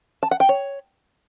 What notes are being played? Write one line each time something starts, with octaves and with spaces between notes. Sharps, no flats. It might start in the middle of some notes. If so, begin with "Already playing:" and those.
A5
F#5
G5
C#5